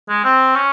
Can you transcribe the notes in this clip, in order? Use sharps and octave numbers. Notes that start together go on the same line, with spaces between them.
G#3
C4
C#4